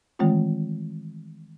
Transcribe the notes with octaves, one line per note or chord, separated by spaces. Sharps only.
D#3 E3 G#3 A3 C4 F4